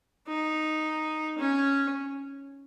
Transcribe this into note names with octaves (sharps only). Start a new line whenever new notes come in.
D#4
C#4